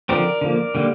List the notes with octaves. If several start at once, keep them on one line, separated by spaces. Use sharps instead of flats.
D3 F3 C4 A#4 D5
D3 F3 A#3
D3 G3 A#3